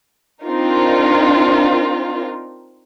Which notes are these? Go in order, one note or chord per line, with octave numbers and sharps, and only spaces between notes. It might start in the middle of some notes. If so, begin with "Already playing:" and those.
C4 D4 D#4 F4 A#4